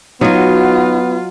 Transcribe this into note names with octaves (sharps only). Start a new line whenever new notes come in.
F#3 B3 D#4 F4 F#4 D#5